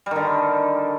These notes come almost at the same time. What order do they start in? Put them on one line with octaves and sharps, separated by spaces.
G3 D#3 D3